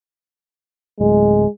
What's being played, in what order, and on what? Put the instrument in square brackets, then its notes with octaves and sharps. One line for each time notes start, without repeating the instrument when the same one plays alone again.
[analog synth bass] D1 [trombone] G#3